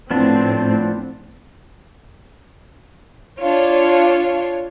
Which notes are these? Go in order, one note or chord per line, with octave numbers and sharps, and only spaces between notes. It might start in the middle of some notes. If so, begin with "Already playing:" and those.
A2 F3 B3 C4 D4
D4 F4 C#5